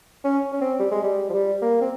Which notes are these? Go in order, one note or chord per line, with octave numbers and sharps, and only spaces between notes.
C#4
C#4
C4
G3
G#3
G3
F3
G3
A#3
C4